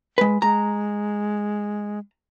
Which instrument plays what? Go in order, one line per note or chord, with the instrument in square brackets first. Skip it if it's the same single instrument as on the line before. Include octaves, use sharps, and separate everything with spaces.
[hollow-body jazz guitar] G#3 B4
[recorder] G#3 [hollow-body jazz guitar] A#5